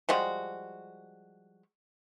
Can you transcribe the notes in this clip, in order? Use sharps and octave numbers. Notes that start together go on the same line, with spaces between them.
F3 G3 G#3 F#4